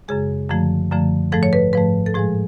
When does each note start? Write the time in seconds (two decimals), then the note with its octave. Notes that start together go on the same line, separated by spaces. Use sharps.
0.08 F#2 C#3 G#3 G#4
0.49 F#2 D3 F3 A3
0.91 F#2 D3 F3 A3
1.32 G#2 F3 A3 A4
1.43 C#5
1.53 B4
1.73 G#2 F3 A3 B4
2.06 A4
2.14 A2 F3 G#3 G#4